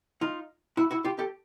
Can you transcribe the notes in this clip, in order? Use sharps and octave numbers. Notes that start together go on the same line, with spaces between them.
D#4 F4
E4 F#4
E4 F#4
F4 G4
G4 A4